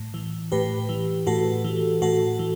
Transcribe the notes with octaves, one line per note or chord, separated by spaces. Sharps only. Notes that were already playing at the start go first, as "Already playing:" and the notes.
Already playing: A2
E3
A2 G4 B4
E3
A2 F#4 A4
E3
A2 F#4 A4
E3